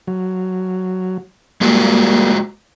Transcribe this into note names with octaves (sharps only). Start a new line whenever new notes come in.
F#3
G3 G#3 A#3 F4 F#4